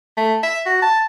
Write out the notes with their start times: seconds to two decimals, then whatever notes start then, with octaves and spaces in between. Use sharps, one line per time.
0.17 A3
0.43 E5
0.66 F#4
0.82 A5